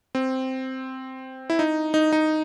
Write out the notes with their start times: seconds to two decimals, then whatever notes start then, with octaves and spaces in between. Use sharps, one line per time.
0.15 C4
1.50 E4
1.59 D#4
1.94 D#4
2.12 D#4